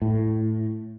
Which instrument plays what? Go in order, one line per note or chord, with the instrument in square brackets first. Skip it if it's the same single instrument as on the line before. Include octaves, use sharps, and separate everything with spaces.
[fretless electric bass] A2